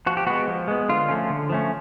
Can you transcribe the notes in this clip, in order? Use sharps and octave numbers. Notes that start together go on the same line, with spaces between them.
F3 F#4
G4
G#3 B3 F#4
F3
G#3 B3
D3 F4
F3 A3 C#4
D3
F3 A3 C#4